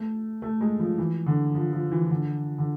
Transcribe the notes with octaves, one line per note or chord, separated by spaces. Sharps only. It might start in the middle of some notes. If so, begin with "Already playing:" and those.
Already playing: A3
A3
G#3
F3
E3
D3
F3
F3
E3
D3
D3